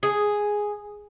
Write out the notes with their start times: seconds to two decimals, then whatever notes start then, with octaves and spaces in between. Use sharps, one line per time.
0.03 G#4